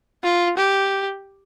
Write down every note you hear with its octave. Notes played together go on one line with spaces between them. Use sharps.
F4
G4